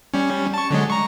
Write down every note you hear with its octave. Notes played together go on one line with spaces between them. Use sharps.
G3 C#4
A5 C#6
D3 F#3 G#3
A#5 C#6